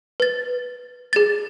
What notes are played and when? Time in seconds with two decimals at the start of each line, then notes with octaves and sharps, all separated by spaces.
0.20 B4 A6
1.13 G#4 A6